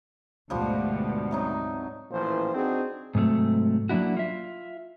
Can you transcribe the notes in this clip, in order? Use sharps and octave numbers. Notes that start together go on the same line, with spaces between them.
D2 G#2 B2 F3 G3 D4
C3 F#3 D#4
A1 A#2 E3 F3 C5
C4 D4 D#4 F#4 G#4
G#2 C3 F#3 G3 A3
F#3 A#3 D4 E4 F#4
F4 E5